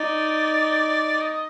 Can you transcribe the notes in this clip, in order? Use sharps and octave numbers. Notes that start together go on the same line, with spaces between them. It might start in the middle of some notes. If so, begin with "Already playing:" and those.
Already playing: D#4 D5
D#5